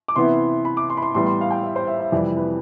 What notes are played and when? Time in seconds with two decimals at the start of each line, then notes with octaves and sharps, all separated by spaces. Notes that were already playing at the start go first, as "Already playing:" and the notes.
0.08 D6
0.16 C3 E3 B3 E4 C6
0.65 B5
0.77 D6
0.90 C6
0.97 B5
1.02 C6
1.15 A2 E3 G3 B3 C6
1.27 C6
1.41 F5
1.51 G5
1.63 E5
1.76 C5
1.87 E5
2.00 E5
2.12 F2 C3 E3 G3 D5
2.37 B4